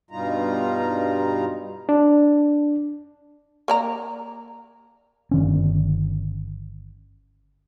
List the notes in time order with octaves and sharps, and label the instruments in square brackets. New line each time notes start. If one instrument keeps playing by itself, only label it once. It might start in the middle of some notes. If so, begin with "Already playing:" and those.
[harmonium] G2 B2 G3 D#4 F4 A#5
[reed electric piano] D4
[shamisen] A#3 D5 A#5
[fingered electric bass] G1 D#3 C#4